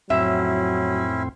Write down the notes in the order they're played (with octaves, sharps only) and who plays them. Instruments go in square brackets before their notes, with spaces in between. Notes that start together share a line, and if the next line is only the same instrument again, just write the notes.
[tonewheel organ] F2 A2 C4 [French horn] F#3 [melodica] C#4 E4 [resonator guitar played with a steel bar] E5